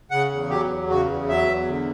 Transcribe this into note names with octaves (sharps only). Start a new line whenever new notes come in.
C#3 F#5
E2
F#3 G4
E2
C#3 F#4
E2
F#3 E5
E2
D3